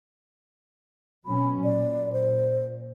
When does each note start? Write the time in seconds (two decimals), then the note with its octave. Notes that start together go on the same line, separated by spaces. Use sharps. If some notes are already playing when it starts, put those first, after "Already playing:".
1.26 B2 F#3 C#4 B5
1.64 A#2 D5
2.12 C5